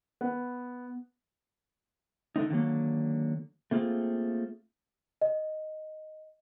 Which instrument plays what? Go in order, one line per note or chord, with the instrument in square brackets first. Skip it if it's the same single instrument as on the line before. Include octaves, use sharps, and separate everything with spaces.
[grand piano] B3
[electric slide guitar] D3 A3 C4 D#4
D3 D#3 F#3 A#3
A3 A#3 C4 F4 G#4
[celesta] D#5